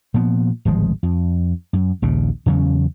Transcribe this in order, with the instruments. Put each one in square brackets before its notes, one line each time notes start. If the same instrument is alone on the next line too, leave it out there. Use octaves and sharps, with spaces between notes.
[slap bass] A#2 F3 B3
D1 G#1 F3 G#3
F2
F#2
A#1 D#2 C#3
E2 C#3 F#3 C#4